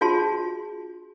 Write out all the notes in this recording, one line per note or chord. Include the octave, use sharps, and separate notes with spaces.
D4 F4 F#4 G#4 A5 C6